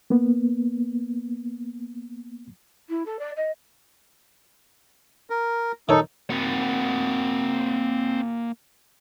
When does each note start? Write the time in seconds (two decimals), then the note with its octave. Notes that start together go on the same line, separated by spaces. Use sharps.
0.10 A#3 B3
2.89 E4
3.06 A4
3.19 D5
3.36 D#5
5.30 A#4
5.89 D#3 D#4 A4 C#5
6.30 A#3 C4 F#4 F#5